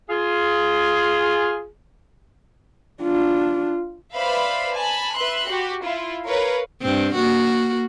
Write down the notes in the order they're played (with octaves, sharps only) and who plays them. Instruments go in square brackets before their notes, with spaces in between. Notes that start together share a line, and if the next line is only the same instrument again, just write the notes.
[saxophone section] F4 G#4
[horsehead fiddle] D4 F4
[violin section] B4 C5 D5 E5 F5 B5
G#5 A5 B5
B4 E5 B5 C6 F#6
F#4 G4
E4 F4
A#4 B4 C#5 F5
[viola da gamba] G2 C4
A#3 F#4